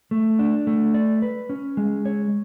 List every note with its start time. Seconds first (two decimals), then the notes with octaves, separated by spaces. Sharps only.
0.11 A3
0.39 D4
0.67 A3
0.94 D5
1.22 B4
1.49 C#4
1.77 G#3
2.05 C#5